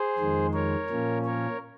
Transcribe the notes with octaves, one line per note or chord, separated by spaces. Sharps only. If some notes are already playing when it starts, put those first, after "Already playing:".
Already playing: G#4 C5
F2 D#3 G#3
A#4 C#5
A#2 F3 A#3 C#4
A#4 C#5